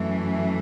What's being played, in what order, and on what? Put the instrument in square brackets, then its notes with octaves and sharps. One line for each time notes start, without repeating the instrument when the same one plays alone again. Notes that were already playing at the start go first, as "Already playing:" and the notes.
Already playing: [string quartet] F#2 E3 A3